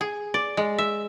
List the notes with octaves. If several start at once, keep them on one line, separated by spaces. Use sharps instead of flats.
G#4
D5
G#3
E5